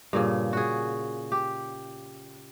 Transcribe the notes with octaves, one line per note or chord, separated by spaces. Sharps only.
G2 A#2 C#3
F#4 G#4
G4